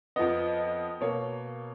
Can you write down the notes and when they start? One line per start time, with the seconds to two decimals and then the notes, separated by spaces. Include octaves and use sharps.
0.16 F2 F3 B3 D#5
1.01 B2 A#3 C#5